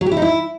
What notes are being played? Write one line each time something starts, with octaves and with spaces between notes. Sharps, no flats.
F#3
G4
E4
D#4
E4